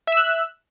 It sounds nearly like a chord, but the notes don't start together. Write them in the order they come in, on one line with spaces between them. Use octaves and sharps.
E5 E6 F#6